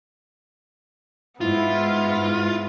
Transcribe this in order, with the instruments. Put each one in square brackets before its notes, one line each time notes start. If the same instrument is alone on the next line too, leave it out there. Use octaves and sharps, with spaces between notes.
[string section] G#2 [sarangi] B3 [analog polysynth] E4 [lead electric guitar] F4